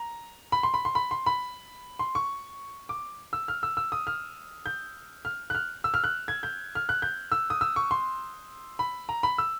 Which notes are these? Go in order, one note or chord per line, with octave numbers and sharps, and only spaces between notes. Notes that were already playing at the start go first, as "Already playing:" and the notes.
Already playing: A#5
B5
C6
B5
C6
B5
C6
B5
C6
C#6
D6
E6
F6
E6
E6
D#6
F6
G6
F6
F#6
F6
E6
F6
F#6
G#6
G6
F6
F#6
G6
E6
D#6
E6
C#6
C6
B5
A#5
B5
E6